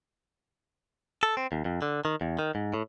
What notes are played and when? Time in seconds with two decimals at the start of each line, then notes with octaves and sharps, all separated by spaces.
1.23 A4
1.37 C4
1.52 D#2
1.65 F2
1.82 D3
2.05 D#3
2.21 E2
2.39 D#3
2.55 G#2
2.74 A2